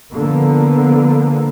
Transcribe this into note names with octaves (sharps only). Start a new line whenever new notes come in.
D3 F3 A#3 B3